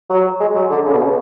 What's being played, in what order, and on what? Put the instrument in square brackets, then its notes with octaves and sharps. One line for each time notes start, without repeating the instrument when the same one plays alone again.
[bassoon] F#3
G#3
F#3
D3
C#3
B2
C#3